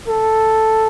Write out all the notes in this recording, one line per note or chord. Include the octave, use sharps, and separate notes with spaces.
A4